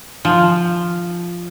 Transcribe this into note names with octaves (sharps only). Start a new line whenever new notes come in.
F3